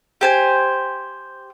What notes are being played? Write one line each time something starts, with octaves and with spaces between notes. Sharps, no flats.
G4 C5 G#5